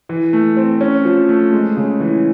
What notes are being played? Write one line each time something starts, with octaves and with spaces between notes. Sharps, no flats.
E3
A3
C4
C#4
F3
A3
G#3
C#3
E3